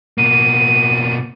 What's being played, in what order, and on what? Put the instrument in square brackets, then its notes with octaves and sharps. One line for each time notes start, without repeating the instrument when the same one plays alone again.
[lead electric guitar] B2 A#3 [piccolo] D#7